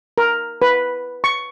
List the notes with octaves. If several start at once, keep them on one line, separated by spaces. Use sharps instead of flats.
A#4
B4
C#6